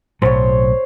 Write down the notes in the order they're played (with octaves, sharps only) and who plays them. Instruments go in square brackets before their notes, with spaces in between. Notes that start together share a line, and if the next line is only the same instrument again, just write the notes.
[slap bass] B1 A2 F#3 [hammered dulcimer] C5 C#5